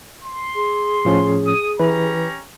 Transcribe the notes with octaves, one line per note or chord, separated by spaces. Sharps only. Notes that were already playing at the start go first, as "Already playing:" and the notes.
C6
G#4
A2 F3 C#4
D#6
E3 C#4 G4 B4 A#5